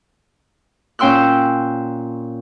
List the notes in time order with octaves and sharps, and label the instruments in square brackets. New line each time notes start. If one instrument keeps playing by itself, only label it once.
[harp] A#2 C#4 G5 C6 E6 F#6